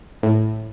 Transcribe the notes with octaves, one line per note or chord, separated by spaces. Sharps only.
A2